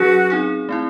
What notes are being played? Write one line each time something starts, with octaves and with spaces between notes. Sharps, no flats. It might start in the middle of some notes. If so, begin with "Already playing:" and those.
Already playing: F#3 C#4 F#4 G#4
C4 D#4 G#4
A3 C4 E4